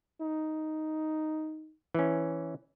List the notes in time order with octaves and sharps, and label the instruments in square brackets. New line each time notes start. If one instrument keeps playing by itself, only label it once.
[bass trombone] D#4
[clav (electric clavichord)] E3 C#4